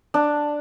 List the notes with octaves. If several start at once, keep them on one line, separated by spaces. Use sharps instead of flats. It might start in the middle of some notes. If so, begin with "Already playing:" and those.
D4